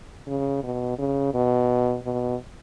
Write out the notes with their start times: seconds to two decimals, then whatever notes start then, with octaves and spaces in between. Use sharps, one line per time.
0.27 C#3
0.64 B2
0.99 C#3
1.34 B2
2.04 B2